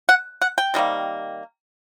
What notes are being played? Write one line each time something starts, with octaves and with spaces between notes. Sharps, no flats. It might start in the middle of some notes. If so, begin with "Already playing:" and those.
F#5
F#5
G5
C3 D#3 G3 A#3